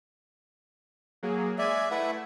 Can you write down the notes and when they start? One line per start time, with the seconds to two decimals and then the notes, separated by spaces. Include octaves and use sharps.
1.23 F#3 A#3 G#4
1.58 G#3 D5 E5 G#5 G#6
1.91 A3 E4 B4 E5 F#5